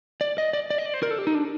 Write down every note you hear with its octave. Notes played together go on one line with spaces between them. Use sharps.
D5
D#5
D5
D5
D#5
D5
C5
A#4
A4
G4
D#4
D4